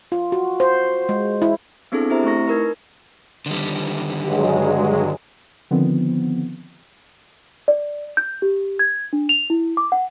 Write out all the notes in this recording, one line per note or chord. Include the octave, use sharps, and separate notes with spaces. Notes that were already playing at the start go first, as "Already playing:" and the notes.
F4
F#4
C5
G#3
E4
B3 C4 D4 E4 G#4 A4
C4 E4 G4 C5 E5 A#5
A3 E4 C#6 A#6
D#4 A#4 B4
D3 D#3 G3
G2 F#3 G#3
D3 D#3 F3 B3 C4
D5
G6
G4
G#6
D4
F7
E4
D6
F#5